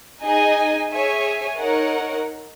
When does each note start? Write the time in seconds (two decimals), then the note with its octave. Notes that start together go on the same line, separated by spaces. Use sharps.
0.21 D#4 G#4 D#5 G#5
0.90 G#4 C#5 E5 G#5
1.59 D#4 A#4 C#5 F#5